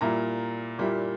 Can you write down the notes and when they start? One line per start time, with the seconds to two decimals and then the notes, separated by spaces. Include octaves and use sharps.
0.01 A#2 G3 A#3 E4 A#5
0.79 A#2 G3 A#3 E4